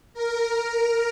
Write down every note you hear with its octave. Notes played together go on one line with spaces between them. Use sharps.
A#4